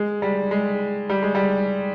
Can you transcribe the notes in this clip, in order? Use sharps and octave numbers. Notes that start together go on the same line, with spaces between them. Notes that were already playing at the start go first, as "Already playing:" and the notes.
Already playing: G#3
G3
G#3
G3
G#3
G3